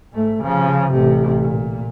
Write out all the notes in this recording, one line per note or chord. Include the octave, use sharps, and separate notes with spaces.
G#2 A3
C#3 F3
A1 C3
A#2